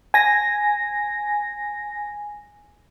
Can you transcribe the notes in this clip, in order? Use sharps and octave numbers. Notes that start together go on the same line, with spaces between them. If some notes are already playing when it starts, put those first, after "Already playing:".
G#5 A#6